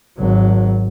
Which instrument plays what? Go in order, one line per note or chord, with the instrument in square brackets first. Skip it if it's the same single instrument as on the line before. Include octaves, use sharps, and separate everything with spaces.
[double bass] G#1 F#3